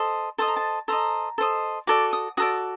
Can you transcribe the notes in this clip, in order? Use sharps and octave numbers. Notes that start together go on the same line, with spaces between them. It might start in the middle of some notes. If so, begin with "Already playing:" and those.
Already playing: A4 C5 D#5
A4 C5 D#5 A5
A#5
A5
A4 C5 D#5 A#5
A4 C5 D#5
F#4 A4 D5 D6
D#6
F#4 A4 D5 D#6